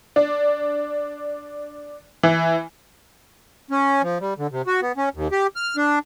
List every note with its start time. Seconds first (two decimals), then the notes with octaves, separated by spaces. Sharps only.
0.16 D4
2.23 E3
3.71 C#4
4.02 F3
4.20 G3
4.38 D3
4.52 C3
4.67 F#4
4.82 B3
4.97 C#4
5.15 D#2
5.32 G4
5.56 F6
5.77 D4